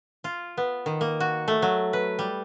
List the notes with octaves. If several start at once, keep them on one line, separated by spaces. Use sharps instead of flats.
F4
B3
D#3
A#3
F#4
A3
F#3
B4
G3